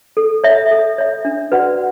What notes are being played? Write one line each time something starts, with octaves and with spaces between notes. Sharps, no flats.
A4
C#5 E5
A4
C#5 E5
D4
F#4 B4 D5 F#5